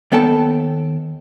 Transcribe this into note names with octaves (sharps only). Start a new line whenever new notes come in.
D#2 B3 A4 G5 A5